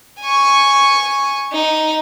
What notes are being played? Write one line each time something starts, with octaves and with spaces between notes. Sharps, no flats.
G#5 C#6
D#4